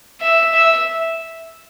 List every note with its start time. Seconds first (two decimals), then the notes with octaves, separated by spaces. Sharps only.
0.21 E5
0.53 E5